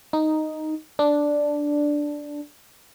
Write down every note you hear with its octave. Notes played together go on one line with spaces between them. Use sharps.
D#4
D4